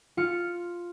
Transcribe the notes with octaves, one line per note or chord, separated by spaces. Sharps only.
F4 F6 C#7